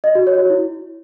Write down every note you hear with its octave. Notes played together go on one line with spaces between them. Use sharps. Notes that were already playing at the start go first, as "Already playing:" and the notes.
D#5
F#4
C#5
F#4
E4